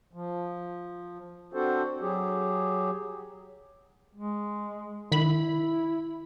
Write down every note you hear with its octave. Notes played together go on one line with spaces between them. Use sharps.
F3
C4 D4 F#4 A4 C5
F#3 G4 G#4
G#3
D#3 E4 B5